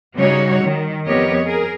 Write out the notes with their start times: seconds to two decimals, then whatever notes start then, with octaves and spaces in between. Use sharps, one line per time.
0.16 C#3 G3 D#4 F#4 C#5
0.63 D#3
1.07 F2 B3 G4 A#4 C#5 D#5
1.45 G#4 A#4